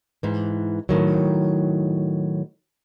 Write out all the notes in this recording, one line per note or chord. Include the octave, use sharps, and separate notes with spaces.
G#2 E3
A2 D#3 F#3